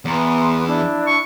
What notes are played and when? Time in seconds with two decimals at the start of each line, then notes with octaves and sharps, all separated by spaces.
0.05 E2 B3 A#5 C6
0.66 D4 E4
1.07 C#6